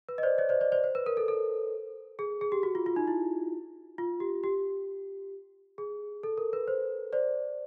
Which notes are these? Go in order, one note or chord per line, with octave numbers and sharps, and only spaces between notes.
B4
D#5
C5 D5
C#5 D#5
C5 D5
C5 D5
C5 D5
C5
B4
A#4
A4
A4
G#4
G#4
G4
F#4
F4
F4
D#4
E4
F4
G4
G4
G#4
A4
A#4
B4
C5
C5 D5